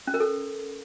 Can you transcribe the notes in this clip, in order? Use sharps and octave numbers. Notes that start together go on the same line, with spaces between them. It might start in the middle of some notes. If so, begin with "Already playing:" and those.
C#4
A#4
A4